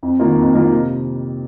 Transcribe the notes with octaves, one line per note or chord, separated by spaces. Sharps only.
F2
D#3 A#3 F4
F2
D#3 A#3 F4
C3